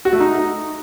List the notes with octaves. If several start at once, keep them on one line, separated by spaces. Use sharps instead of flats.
F#4
A3
D#4